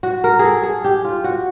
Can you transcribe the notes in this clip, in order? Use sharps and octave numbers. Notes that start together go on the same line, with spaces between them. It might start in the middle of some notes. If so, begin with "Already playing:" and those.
F#4
A#4
G#4 A4
G#4
G4
F4
F#4